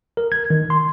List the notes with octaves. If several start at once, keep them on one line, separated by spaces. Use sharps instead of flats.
A#4
G#6
D#3
C6